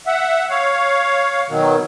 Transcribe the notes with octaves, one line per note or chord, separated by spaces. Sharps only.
E5 F#5
C#5 F5
B2 D#3 F#3